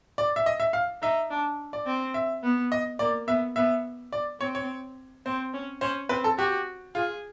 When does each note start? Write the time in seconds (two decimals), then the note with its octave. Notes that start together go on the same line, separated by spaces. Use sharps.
0.18 D5
0.36 E5
0.46 D#5
0.60 E5
0.73 F5
1.02 D#4 E5
1.30 D4
1.73 D5
1.87 C4
2.14 E5
2.43 B3
2.72 D#5
2.99 A#3 D5
3.27 B3 E5
3.56 B3 E5
4.12 D5
4.40 C4 C#5
4.55 C#5
5.26 C4 C5
5.53 C#4
5.81 C#4 C5
6.09 C4 B4
6.24 A4
6.38 F#4 G4
6.95 F4 G#4